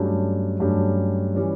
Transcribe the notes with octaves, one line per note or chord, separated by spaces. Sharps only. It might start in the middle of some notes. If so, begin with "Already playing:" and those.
Already playing: G2 F#3 A3 C#4 G4
G2 F#3 A3 C#4 G4
E3 G3 C#4